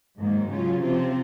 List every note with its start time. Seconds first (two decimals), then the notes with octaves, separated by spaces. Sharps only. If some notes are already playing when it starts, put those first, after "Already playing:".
0.18 G#2 D#3 F#3 A#3
0.50 C#3 F#3 C#4 F4
0.81 C3 F3 C4 F4